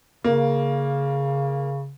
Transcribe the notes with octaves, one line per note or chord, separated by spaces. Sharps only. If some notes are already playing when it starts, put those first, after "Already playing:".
C#3 A#3